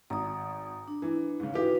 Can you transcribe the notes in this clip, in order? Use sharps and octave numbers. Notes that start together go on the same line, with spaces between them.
G#1 A#5 D#6
D4
E3
G#2 C#3
E3 D#4 F#4 G4 B4